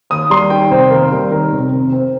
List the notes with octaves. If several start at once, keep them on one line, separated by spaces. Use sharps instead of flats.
D#2 D#6
G3 C6
D#3 G5
F1 C5
D#2 A#4
G3
D#3 A#4
F1
C3
C4